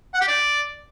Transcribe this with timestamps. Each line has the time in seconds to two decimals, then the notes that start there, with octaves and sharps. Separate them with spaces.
0.14 F#5
0.21 G4
0.28 D5